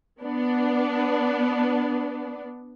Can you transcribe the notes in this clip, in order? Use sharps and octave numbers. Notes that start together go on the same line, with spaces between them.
B3 D4